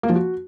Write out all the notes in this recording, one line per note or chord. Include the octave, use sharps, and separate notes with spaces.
A#3
F3
F#4